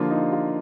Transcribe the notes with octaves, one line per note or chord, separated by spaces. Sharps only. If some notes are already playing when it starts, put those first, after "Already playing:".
Already playing: D3 F3 A#3 F4
D#4
F4